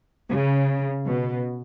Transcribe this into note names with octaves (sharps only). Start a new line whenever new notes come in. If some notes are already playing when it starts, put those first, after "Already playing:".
C#3
B2